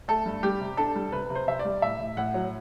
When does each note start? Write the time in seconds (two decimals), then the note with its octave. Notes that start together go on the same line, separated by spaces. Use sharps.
0.08 A3 A4
0.26 G2
0.43 G3 G4
0.60 C3
0.77 D4 A4
0.95 G3
1.12 C3 B4
1.30 C3
1.35 C5
1.47 C3 E5
1.59 D5
1.65 G3
1.82 A2 E5
1.99 A2
2.17 A2 F#5
2.34 F#3